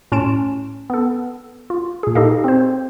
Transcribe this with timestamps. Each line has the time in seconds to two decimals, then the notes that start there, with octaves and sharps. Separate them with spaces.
0.12 A2 C#4 A5 C6 D7 E7
0.90 B3 A4
1.70 F4
2.03 A#2 G#4
2.15 D#4 G4 A4 D#5 F5
2.44 C4 C5